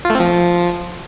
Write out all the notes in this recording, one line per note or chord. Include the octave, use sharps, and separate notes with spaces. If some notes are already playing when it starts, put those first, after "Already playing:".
F4
A3
C4
F3